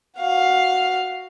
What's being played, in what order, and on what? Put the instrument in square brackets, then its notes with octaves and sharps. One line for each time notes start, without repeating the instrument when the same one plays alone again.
[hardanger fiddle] F#4 F5